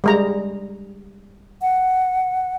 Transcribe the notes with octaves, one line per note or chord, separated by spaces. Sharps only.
G3 G#3 A#5
F#5